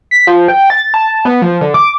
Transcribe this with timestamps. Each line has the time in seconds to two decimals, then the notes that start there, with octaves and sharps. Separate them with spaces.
0.11 B6
0.27 F3
0.48 G5
0.70 A6
0.94 A5
1.25 B3
1.42 F3
1.61 D3
1.74 D6